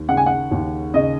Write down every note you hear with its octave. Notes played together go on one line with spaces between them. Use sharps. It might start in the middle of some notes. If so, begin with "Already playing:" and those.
Already playing: D#2
C#3 F#5
G#5
F#5
D#2
C#3 D#5